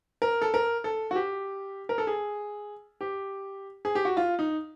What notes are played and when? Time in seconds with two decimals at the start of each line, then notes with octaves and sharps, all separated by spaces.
0.22 A#4
0.42 A4
0.54 A#4
0.84 A4
1.11 F#4
1.16 G4
1.89 A#4
1.98 A4
2.07 G#4
3.01 G4
3.85 G#4
3.95 G4
4.05 F#4
4.17 F4
4.39 D#4